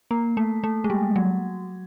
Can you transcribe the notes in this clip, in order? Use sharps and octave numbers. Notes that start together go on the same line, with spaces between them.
A#3
A3
A3
G#3
G3
F#3